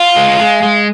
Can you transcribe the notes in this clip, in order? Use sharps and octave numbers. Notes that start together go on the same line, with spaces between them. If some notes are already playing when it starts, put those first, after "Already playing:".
Already playing: F4 F5
G#3
G#3
G#3